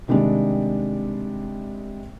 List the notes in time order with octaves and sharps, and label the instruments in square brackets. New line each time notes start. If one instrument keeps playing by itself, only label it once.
[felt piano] C3 D#3 G3 G#3 D4